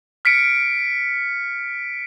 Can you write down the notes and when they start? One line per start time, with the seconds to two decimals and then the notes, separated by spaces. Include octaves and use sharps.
0.25 F6 B6 C#7 D7